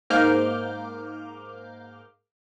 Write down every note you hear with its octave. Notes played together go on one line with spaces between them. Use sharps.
G#2 A#3 D6 F6 G6